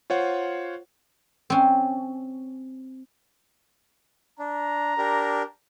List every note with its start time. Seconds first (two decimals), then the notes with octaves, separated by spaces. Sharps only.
0.10 F4 C5 C#5 F#5
1.50 C4 C#4
4.39 D4 A#5
4.98 D4 G4 A#4